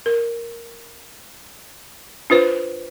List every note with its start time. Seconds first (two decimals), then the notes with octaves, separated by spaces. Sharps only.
0.06 A#4
2.30 D4 F4 B4 C5